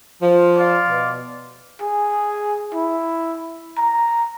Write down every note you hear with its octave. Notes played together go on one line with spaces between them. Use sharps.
F3
D5 F5 C6
B2
G#4
E4
A#5